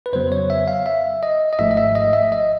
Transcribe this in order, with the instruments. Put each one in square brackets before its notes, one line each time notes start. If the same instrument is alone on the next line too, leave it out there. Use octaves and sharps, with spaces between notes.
[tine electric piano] B4
F2 C#3 F#3 B3 C5
C#5
E5
F5
E5
D#5
D#5
G#1 G#2 F3 A3 E5
D#5
E5
D#5
E5
D#5